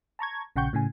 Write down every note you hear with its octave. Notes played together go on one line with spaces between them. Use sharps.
A5 A#5 C#6 G#6
A#1 C#3 F#5 G5 C#6 G6
A2 C#3 G#5